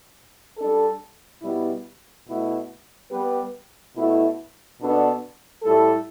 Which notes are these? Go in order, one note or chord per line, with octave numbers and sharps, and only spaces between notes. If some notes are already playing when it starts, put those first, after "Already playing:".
G3 D4 A4
B2 G3 B3 E4
B2 A3 E4
G3 B3 G4 B4
B2 A3 E4
B2 B3 D4 A4
A2 G3 E4 A4